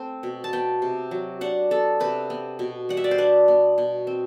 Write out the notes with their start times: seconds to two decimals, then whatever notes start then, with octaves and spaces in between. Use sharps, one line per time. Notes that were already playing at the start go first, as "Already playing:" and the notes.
Already playing: A3 C4
0.23 B2
0.44 A5
0.53 B3 G5
0.82 C3
1.11 F#3
1.41 D4 F#5
1.71 B3 A4
2.00 C3 B4
2.30 B3
2.59 B2
2.89 G3 F#5
2.97 E5
3.04 D5
3.11 C5
3.18 D4 B4
3.48 B3
3.78 B2
4.07 C4